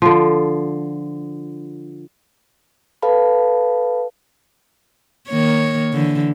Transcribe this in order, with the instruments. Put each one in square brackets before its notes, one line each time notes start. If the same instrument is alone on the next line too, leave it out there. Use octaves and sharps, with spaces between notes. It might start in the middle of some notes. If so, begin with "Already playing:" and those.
[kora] D3 F3
[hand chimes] A4 B4 F5 A5 B5
[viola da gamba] D#3 A#3 C#5
D3 E3